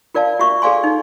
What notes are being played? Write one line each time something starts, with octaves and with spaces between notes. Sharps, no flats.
F4 A#4 D5 F5 A5
F4 F#4 E5 C#6
G#4 A4 D5 F5 G#5 C6
D#4